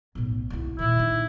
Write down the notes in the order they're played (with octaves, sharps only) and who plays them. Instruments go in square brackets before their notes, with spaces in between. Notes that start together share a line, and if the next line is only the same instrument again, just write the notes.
[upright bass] B1 A2
D2 E4
[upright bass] A#2 D#3 [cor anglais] E4
[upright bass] D#4